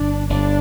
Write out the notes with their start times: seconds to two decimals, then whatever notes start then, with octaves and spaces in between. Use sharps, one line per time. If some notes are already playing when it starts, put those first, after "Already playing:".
Already playing: G1 D4
0.30 G1 D4